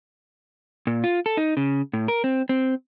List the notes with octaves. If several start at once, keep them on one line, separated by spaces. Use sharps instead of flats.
A#2
F4
A4
D#4
C#3
A2
A#4
C4
C4